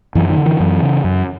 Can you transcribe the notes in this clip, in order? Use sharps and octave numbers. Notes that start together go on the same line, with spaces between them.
F#2 E3
D#3
D3
E3
F#2
C#3
F#2